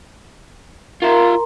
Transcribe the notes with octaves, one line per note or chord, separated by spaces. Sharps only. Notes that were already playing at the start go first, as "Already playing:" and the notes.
F4 A#4 E5 A#5 C6